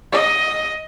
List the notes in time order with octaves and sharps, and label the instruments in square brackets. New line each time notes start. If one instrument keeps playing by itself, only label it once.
[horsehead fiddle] D#5